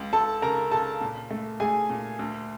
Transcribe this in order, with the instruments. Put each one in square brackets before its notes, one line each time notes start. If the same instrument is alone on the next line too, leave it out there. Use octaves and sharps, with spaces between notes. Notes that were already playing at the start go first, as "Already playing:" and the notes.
Already playing: [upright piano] C#2
C#2 A4 A5
C#3 A#4 A#5
C#3 A4 A5
A#2
A3
A3 G#4 G#5
A#2
D2